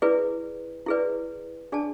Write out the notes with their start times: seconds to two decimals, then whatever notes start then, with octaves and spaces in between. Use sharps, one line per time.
0.02 E4 G#4 B4 D5
0.86 E4 G#4 B4 D5
1.72 D4 G#4 D5 A5